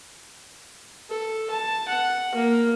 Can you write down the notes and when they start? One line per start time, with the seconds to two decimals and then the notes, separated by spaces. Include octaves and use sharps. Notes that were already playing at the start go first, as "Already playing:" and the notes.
1.09 A4
1.50 A5
1.88 F#5
2.35 A#3